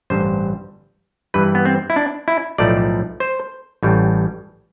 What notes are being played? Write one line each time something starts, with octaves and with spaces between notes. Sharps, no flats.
A1 G2 D3 G3 C5
G2 E3 G3 B4
B3
C4
E4
D4
E4
B1 A2 F3 A3 D5
C5
A1 A2 G3